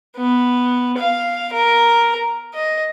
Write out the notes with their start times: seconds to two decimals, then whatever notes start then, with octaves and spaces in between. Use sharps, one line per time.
0.17 B3
0.99 F5
1.53 A#4
2.55 D#5